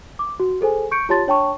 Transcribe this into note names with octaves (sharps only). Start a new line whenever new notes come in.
D6
F#4
G#4 A4 C5 G#5
C#6 G6 C#7 D7
F4 G4 C#5 A5 C6 A6
D4 C#5 G5 A5 C#6